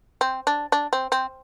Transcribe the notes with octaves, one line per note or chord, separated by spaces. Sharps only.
C4
D4
D4
C4
C4